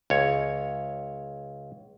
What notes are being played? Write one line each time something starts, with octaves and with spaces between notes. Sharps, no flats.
C#2 C#5